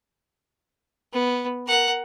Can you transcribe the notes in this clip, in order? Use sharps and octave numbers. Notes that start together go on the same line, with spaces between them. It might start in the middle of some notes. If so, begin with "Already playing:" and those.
B3
A#4 F#5